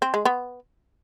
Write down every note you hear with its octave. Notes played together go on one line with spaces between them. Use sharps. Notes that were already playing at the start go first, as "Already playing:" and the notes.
C4
G#3
B3